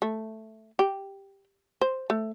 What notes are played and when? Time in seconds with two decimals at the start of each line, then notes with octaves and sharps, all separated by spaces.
0.02 A3
0.79 G4
1.81 C5
2.10 A3